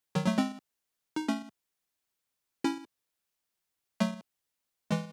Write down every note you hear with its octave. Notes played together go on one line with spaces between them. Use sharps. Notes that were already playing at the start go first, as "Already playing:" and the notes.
D#3 F#3
F#3 A3
G#3 C4
D#4
A3 C#4
C#4 E4
F#3 A3
E3 G#3